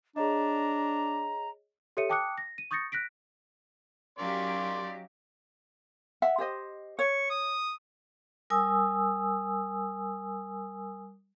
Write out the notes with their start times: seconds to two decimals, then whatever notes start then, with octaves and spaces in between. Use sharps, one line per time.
0.16 D4 G#4 C#5 D#5 A#5
1.97 G4 A4 C#5 E5 C#7 D#7
2.09 G5 A5 D6 D#6 F#6 C#7
2.38 A#6
2.58 D#7
2.71 C#6 D#6 G6 A6 A#6 C#7
2.92 F#6 A#6 B6 D7
4.18 F#3 C#4 D#4 G4 D5 F5 C6
6.22 E5 F#5
6.38 G4 C5 D#5
6.99 C#5 C#6
7.30 D#6
8.50 G3 A#4 G#5 D#6 E6